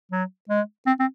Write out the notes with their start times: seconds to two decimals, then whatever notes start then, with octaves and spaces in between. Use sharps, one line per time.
0.12 F#3
0.49 G#3
0.86 C4
0.99 C4